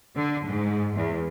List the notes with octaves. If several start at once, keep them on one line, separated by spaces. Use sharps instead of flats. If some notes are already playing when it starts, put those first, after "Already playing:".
D3
G#2
E2